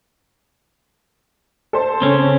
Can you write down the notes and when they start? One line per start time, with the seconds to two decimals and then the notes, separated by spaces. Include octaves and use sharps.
1.73 A4 C5 A5
2.02 C#3 C4 C#4